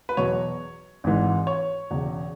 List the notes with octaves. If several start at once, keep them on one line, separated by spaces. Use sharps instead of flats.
B4
E2 B2 F#3 C#5
G#1 G#2 E3 G#3
C#5
E1 E2 C#3